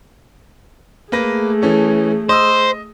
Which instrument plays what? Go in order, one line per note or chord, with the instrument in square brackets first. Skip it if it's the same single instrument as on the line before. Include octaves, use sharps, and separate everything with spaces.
[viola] A3 G#4 [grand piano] A#3 B4 A#6
[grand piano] E3 C#4 A4
[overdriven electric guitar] C5 [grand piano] D#5 D#6 E6